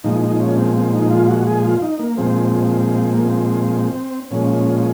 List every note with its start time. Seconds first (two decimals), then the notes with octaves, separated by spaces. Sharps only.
0.04 A#2 F3 G#3 D#4
0.21 D#4
0.39 C#4
0.57 C4
0.75 C4
0.93 D#4
1.11 F4
1.28 F#4
1.47 G#4
1.65 F4
1.82 D#4
1.99 A#3
2.17 A#2 F3 G#3 C4
3.14 A#3
3.24 C4
4.31 A#2 F3 G#3 C#4
4.78 C#4